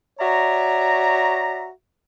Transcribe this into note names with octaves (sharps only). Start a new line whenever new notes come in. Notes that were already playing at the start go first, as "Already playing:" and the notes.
F#4 C#5 D5 E5 A#5